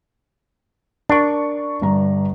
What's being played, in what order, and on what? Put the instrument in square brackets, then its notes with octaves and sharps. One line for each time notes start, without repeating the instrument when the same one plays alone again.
[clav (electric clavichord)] D4 [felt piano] A#4 C#6
[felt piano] G1 G2 A#5